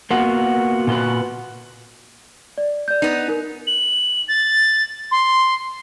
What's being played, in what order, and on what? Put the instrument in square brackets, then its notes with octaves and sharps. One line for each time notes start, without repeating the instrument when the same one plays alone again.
[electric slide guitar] A#3 B3 F4 F#4
A#2 F4 F#4 B4
[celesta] D5
D5 G6
[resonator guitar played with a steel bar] B3 D#4
[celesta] D#4 A#4
[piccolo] F#7
A6
C6